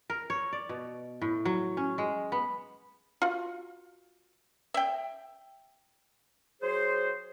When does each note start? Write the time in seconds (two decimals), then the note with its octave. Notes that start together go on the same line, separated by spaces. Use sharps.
0.10 A#4
0.30 C#5
0.53 D5
0.69 B2
1.22 A2
1.45 F#3
1.77 C#4
1.98 G#3
2.32 B3
3.22 F4 F#4
4.74 E5 G5
6.62 F#3 G#4 C5